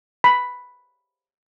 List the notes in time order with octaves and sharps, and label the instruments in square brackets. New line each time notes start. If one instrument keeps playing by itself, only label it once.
[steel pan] B5